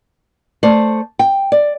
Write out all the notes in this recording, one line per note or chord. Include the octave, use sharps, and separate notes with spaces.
A3 C5 D5
G5
D5